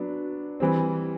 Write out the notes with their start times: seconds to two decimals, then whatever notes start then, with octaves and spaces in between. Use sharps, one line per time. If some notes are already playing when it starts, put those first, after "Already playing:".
Already playing: F#3 B3 D4
0.60 E3 G3 C4